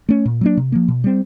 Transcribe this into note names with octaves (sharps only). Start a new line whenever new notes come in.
A3 C#4
A#2
F#3 A#3 D4
C3
F3 A#3
B2
G3 C4